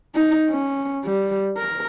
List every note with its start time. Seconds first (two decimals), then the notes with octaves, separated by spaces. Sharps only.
0.15 D#4
0.50 C#4
1.04 G3
1.57 A#4